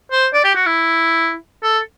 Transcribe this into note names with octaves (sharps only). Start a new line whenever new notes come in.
C5
D5
G4
F#4
E4
A4